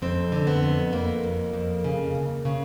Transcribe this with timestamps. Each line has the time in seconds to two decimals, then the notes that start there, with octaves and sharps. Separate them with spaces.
0.02 F2 C4
0.32 D3
0.47 B3
0.63 F2
0.93 F2 A#3
1.24 F2
1.53 F2
1.84 C#3
2.15 D#2
2.45 C#3